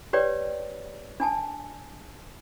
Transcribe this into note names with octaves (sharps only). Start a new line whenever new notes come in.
G4 B4 C#5 D5 G5
D4 G#5 A5